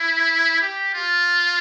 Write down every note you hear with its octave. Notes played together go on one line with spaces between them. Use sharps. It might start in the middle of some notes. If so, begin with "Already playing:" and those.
Already playing: E4
G4
F4